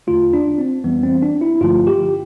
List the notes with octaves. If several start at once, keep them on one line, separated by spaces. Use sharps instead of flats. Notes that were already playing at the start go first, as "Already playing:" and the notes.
E2 D3 A3 F4
D4
C4
F2 E3 G3 B3
C4
D4
E4
G2 D3 F3 A3 F4
G4